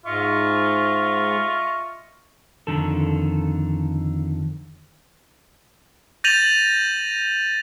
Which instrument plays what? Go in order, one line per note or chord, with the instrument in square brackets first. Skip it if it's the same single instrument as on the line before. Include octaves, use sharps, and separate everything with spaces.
[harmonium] G#2 [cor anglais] F4 [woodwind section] D#5 E5 C#6
[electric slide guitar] F2 A2 D3 D#3 A4
[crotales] G6 A6 A#6 D#7 F7 F#7